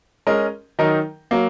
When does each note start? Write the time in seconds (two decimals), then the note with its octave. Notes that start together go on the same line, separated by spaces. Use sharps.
0.27 G#3 C#4 A#4 D#5
0.79 D#3 F#3 D#4 A#4 D#5
1.31 F#3 A#3